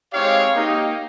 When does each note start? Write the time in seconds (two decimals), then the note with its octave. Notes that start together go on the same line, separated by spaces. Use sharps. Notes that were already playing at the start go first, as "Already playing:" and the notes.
0.12 G#3 C4 D#4 G4 C#5 F5
0.55 A#3 D#4 G4